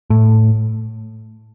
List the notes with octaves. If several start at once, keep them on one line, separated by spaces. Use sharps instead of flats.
A2